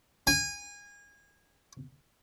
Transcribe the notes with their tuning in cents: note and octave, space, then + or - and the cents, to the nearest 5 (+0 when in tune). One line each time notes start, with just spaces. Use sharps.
G#5 -25